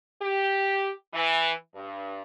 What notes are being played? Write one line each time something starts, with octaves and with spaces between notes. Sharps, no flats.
G4
E3
G2